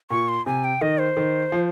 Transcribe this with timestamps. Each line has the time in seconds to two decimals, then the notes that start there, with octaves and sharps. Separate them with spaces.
0.10 A#2 C#6
0.28 C6
0.46 C3 G#5
0.64 G5
0.81 D#3 D#5
1.00 C5
1.17 D#3
1.52 F3